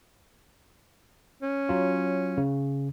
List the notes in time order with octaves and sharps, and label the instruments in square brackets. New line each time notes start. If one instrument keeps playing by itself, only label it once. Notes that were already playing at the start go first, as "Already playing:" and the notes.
[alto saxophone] C#4
[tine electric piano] F#3 F4
C#3